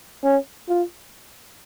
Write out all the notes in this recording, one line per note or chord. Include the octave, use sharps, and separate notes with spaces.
C#4
F4